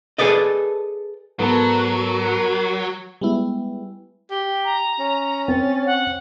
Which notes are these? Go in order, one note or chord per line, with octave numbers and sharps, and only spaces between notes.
G#4 A4 B4 D5 D#5
G#2 F#3 B3 A4 A#4 A5
G3 G#3 B3 E4
G4
A#5
C#4
C4 A6
F#5